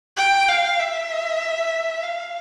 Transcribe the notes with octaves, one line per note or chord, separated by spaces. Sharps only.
G5
F5
E5
F5